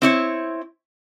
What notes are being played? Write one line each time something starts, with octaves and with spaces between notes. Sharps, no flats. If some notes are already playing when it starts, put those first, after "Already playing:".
C4 E4 C#5